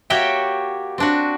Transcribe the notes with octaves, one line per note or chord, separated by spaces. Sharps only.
A#3 F#4 G4 C#5 E5 G5
C4 D4 F#4